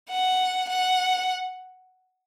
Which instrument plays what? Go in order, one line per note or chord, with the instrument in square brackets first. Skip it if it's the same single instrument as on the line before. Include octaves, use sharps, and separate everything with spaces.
[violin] F#5
F#5